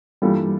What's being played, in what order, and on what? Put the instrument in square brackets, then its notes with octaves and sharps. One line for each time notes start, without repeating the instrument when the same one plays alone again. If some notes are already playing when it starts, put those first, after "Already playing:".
[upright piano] G2 E3 A#3 F4 A4 [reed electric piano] G3